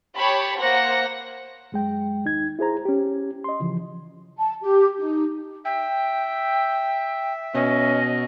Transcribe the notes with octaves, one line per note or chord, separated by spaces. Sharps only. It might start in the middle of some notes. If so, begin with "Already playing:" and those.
G4 C#5 A5 B5
A#3 C5 F#5 A#6
F#2 G#3 G5
D#2 D#4 G#6
E4 G#4 C5 A#5
C#4 G4
D#5 C6
C#3 E3 F3
A5
G4
D#4
E5 G5
B2 C#4 D#5